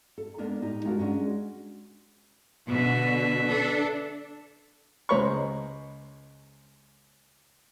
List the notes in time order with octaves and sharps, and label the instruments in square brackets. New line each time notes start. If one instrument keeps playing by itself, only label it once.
[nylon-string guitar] A4
G#3 A#3 B3 D4 A#4
A2 D#4 G4
G#3 D4 F4 F#4 A#4
G#3 C#4 D4 F#4
[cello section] B2 D3 [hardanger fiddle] B4 E5
[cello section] D4 A4
[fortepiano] C#2 G#3 C5 A#5 B5 C#6